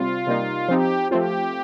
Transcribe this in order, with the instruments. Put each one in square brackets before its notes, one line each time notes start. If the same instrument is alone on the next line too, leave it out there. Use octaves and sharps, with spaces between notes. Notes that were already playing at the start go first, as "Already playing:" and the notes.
Already playing: [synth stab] C3 G3 C4 [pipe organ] F4
[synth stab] C3 G3 A#3 D#4
[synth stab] F3 C4 D#4 [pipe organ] G4
[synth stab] F3 A3 C4 F4 [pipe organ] G4